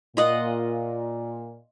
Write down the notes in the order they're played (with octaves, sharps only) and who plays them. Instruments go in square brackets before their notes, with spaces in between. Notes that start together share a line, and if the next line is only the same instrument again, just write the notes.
[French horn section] A#2 [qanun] F4 D#5 F#5